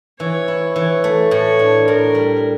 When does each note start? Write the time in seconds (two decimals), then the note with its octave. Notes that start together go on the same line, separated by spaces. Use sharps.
0.20 E3 C#5
0.48 E4
0.75 E3 C#5
1.04 A3
1.31 A2 C#5
1.59 D4
1.87 A2 A#4
2.15 G3